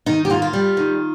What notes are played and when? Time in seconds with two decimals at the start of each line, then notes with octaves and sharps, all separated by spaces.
0.06 D#3 D#4
0.25 G4
0.30 A#3 F4
0.42 F4
0.53 G3
0.77 D#3